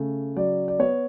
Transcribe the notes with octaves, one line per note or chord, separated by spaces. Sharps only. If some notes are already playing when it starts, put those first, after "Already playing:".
Already playing: C#3 A3
F#3 D5
D5
B3 C#5